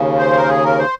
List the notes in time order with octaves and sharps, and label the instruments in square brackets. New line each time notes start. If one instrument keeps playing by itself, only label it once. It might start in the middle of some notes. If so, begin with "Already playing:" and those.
Already playing: [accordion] D#2 C#3
C5
A#4
G#4
A#4
C5